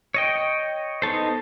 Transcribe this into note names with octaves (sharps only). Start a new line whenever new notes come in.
C#5 D#5 G5
B3 D#4 A4 C5